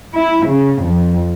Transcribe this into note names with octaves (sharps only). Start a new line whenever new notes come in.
E4
C#3
F2